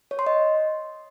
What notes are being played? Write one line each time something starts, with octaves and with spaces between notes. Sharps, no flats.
C#5
C6
D#5